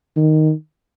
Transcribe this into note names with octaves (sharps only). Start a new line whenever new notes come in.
D#3